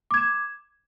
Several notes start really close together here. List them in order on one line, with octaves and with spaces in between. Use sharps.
D6 G#6 E7